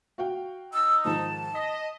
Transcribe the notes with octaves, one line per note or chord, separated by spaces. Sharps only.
F#4 F5 G5
D#4 D#6 E6
G#2 D#3 F3 A5
D#5 B6